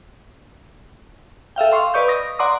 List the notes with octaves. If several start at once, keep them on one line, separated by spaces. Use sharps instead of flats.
A4 E5 F5 G5
F5 C6 C#6
B4 D5 D#5 C#6 G6
D#6 A#6
D5 F#5 A#5 C6 D6 D#6